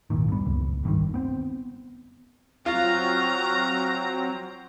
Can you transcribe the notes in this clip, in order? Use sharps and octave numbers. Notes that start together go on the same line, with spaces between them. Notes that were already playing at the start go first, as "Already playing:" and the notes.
G#1 D#2 A#2 D#3
G2 B3
C#2 F#2
G#1 G2 B2 D#3
B3 C4
F#3 C4 F4 A#5 C#6 F6 F#6